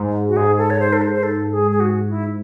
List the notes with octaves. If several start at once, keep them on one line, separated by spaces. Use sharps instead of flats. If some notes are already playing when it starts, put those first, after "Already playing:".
Already playing: G#2
F#4
G#2 G#4
A4
C#5
C5
A4
C5
C5
A4
G#4
G#4
F#4
E4